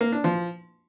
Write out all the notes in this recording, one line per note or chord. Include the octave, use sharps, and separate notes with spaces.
A#3
D4
F3